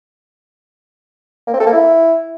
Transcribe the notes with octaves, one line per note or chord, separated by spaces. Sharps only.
A#3
C4
A4
A#3
E4